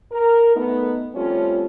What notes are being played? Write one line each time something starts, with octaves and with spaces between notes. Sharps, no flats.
A#4
A3 B3 D#4
F3 G3 A3 C4 C#4 F4